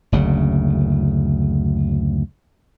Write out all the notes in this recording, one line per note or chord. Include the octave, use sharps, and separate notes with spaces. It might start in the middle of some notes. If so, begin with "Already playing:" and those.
F#1 D2 C#3